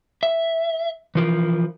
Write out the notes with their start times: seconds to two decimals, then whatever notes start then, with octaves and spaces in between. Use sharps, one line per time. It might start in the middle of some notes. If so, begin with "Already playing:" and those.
0.23 E5
1.15 E3 F3 A#4